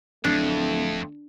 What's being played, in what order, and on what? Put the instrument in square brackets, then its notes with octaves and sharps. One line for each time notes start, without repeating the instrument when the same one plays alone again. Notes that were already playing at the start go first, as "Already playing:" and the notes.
[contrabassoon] D1 [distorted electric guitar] F2 [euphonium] A3 [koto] D4